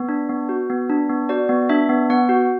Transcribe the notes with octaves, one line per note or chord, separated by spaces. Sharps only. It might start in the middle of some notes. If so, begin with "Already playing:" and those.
Already playing: B3
D4
B3
F#4
B3
D4
B3
F#4 D5
B3
D4 E5
B3
B3 F#5
F#4